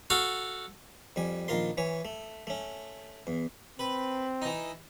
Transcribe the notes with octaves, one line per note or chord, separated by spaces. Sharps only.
F#4 A4 F5
F2 G3 G#5
A#1 D#3 F4 A#4 C6
E3 C#5 G#5
A3
A3 C#4
E2
C4 B4
E3 D#4